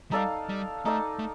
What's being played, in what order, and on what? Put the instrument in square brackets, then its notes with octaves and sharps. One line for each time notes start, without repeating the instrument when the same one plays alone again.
[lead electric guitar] G3 [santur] D#4 A4 D5 F5
[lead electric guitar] G3
[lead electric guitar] A3 [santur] D#4 A4 D5 F5
[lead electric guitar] A3